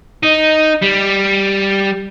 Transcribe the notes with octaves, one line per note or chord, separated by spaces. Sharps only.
D#4
G3